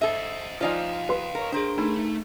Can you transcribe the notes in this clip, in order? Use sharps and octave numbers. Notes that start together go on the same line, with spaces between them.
A4 C5 D#5 E5
F3 D#4 F4 C5 D5 D#5 F5 G#5
B4 C6
A#4 C#5
D4 G#4 A#4 C5
A3 D#4 B5